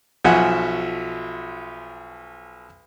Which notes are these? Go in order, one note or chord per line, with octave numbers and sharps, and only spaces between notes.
B1 F3 F#4 E5 F#5 G#5